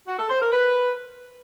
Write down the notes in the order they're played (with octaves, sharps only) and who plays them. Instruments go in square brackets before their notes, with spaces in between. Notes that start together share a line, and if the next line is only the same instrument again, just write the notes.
[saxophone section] F#4
A4
C5
A#4
B4